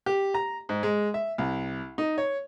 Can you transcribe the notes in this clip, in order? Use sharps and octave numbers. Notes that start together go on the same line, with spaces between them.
G4
A#5
G#2
G#3
E5
C2
D#4
C#5